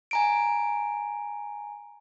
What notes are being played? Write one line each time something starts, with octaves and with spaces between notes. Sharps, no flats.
G#5 A#5 D7